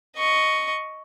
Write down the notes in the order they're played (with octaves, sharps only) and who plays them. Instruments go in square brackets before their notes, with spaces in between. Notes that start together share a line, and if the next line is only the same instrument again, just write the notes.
[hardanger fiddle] D#5 C#6